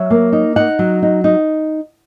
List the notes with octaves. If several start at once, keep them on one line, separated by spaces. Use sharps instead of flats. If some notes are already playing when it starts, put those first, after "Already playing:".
Already playing: F#3 E5
A#3
D#4
D#4 F#5
F#3
D#4
D#4